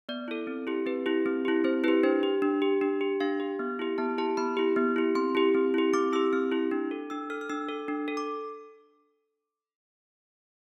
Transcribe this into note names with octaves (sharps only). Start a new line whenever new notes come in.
B3 D5
E4 A4
C4
E4 G4
C4 B4
E4 G4
C4
E4 G4
C4 C5
E4 G4 B4
D4 C5
G4
D4
G4
D4
G4
D4 F5
G4
B3
E4 G4
B3 A5
E4 G4 A5
B3 B5
E4 G4
B3
E4 G4
C4 C6
E4 G4
C4
E4 G4
C4 D6
E4 G4 E6
C4 F6
E4 G4
D4
A4
D4 E6
A4 F6
F6
D4 E6
A4
D4
A4
D6